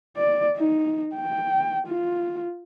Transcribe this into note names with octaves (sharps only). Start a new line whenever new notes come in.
D5
D#4
G5
F4